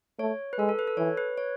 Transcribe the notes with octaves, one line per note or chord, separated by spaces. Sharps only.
A3 C#5
B4
G#3 A4
A4
B4
A4
E3 C#5
B4
C#5